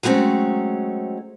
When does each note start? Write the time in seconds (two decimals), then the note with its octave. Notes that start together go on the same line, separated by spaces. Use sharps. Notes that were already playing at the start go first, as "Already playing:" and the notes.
0.03 F#3 G#3 A3 C4 C#4